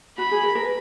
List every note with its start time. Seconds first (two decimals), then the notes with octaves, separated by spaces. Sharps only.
0.18 F#4 B5
0.31 G#4
0.43 A#4
0.55 A#4
0.65 B4